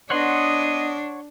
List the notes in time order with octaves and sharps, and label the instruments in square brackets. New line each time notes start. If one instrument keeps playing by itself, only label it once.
[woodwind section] B3 D#5 [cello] D4 [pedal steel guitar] C#5 F#5 C6